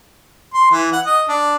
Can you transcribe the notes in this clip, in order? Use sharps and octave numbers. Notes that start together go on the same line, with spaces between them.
C6
E3
F#5
D#5
D4